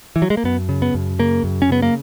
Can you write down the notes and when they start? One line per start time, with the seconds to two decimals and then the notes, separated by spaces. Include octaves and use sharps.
0.16 E3
0.22 F#3
0.30 G#3
0.37 A#3
0.44 F#2 B3
0.69 C#3
0.82 B3
0.94 F#2
1.19 C#3 A#3
1.44 F#2
1.62 C#4
1.69 C#3 B3
1.82 A#3